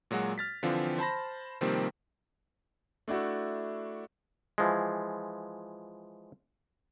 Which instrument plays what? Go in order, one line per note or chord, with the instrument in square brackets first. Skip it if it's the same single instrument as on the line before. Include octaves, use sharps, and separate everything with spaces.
[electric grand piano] A#2 F#3 G#3 F#4
F6 A6 B6
D3 E3 F3 C4 F4
C5 A5 B5 A#6
C3 D#3 F3 G3 A#3 C4
[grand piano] A3 D4 E4 F#4
[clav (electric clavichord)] E3 F3 G#3